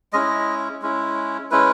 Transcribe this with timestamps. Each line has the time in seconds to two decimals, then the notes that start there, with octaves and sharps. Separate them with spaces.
0.13 G#3 C#4 E4 D#5
0.82 G#3 C#4 E4
1.51 G#3 C#4 E4 B4